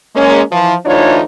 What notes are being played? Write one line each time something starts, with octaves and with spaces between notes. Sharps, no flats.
G#3 A#3 C#4
E3 F3
D2 E3 D4 D#4 F4 C#5